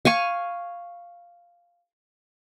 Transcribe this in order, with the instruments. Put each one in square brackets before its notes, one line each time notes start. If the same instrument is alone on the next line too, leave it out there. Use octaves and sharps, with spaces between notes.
[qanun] F5 G#5 C#6